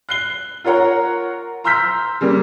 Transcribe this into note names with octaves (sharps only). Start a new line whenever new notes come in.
F#6 C7 G7
F4 A#4 C#5 F#5 A#5
A#5 C6 E6 F6 G6 B6
C#3 G3 A#3